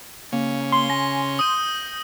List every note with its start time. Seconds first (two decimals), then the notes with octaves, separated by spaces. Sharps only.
0.32 C#3 A#3 C#4
0.72 C6 G7
0.90 G#5 A#6
1.39 D#6 G6 D#7